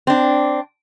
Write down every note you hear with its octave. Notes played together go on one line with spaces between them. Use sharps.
C4 D4